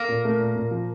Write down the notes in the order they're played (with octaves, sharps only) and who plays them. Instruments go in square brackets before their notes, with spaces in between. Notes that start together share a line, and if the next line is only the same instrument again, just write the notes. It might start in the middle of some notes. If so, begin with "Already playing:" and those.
Already playing: [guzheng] A#3 A#4
[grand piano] A#2
A3
A#2
A#2
F3